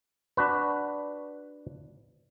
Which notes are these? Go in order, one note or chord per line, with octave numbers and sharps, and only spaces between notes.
D4 F#4 B4